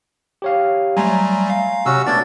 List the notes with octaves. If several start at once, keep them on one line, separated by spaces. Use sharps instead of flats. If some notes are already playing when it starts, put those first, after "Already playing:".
G4 C#5 F5
F#3 G3 A3 G#5 A#5 C6
F5
C3 C#4 F#4 E6
A3 B3 D4 F#4 D5 G#6 A6